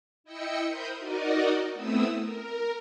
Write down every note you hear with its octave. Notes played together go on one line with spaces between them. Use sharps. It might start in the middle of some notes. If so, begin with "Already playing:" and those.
E4 D#5 G5 E6 C#7
A#4 C5 E5 B5 D#6 G6
D#4 F#4 A#4 D5 D#5
A3 B3 C4 E4 D#6 E6
A#4